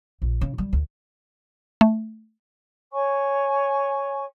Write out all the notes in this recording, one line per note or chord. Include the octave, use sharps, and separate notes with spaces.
A#1
C#3
G3
D2
A3
C#5 G#5 C#6